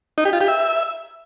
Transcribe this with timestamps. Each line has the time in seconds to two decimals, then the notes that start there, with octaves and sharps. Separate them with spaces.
0.18 D#4
0.25 G4
0.33 F4
0.41 G4
0.48 E5